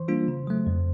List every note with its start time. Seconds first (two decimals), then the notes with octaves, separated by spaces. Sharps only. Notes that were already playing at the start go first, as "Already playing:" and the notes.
Already playing: E3 C5 C6
0.08 G3 A#3 D4 F4
0.28 C#3
0.47 F#3 A3
0.67 F2